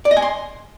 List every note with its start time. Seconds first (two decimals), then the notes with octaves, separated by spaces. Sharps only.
0.05 D5
0.11 D#5
0.17 G#5
0.22 C6